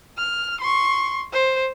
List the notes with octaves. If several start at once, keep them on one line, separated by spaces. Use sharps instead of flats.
F6
C6 C#6
C5